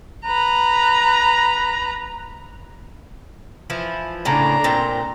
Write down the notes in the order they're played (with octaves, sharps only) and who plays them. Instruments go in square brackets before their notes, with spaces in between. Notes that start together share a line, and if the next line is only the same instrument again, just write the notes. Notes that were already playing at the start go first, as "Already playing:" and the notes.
[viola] B4 A#5
[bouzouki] E3 F3 E4
[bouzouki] A2 C#3 A#3 [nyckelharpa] D4 A#5
[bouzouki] A#2 C4 G5